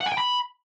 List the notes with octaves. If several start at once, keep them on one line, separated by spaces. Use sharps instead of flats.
F#5
G#5
G5
B5